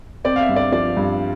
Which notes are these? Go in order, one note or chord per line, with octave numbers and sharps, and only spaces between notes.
C4 D5
F5
E5
G2
D5
F3 D5
G2